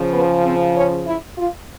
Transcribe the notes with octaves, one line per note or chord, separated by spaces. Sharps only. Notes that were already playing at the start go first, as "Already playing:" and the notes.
Already playing: C#3 F3
B3
C4
C#4
E4
F4